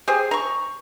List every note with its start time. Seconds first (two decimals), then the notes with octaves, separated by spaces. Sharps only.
0.08 G4 G#4 C5
0.31 A#5 C#6